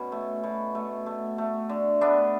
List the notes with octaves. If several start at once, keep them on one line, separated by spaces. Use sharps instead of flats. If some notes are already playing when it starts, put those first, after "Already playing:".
Already playing: B2 C#4
A3
B2
A3
A3
A3
D3
A3 B3 D4